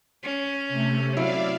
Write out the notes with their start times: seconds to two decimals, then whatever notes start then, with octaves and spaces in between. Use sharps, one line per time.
0.23 C#4
0.69 C3 A3
1.17 F#3 E4 D5 E5 F5